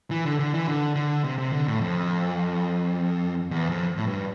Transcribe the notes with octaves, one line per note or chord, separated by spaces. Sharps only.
E3
D3
D3
E3
D3
D3
C3
C3
D3
A2
F2
E2
F2
A2
G2